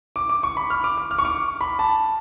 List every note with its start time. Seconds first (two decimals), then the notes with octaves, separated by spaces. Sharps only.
0.16 D6
0.29 D6
0.43 C#6
0.57 B5
0.70 F6
0.84 D6
0.98 D6
1.11 F6
1.19 C#6
1.25 D6
1.61 B5
1.79 A5